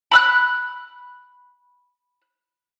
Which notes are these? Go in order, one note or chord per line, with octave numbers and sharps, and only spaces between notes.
B5 E6 F#6